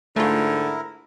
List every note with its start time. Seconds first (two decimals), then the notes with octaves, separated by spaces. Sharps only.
0.16 G#2 D3 A3 E4 F4 A#4